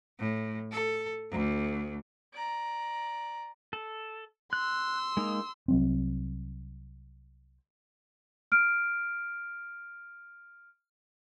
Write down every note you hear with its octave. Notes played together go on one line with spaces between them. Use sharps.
A2
A4
D2
D5 A#5
A4
C6 E6 F#6
G#3 A#3 D#4
C2 F#3 C4
F6 D7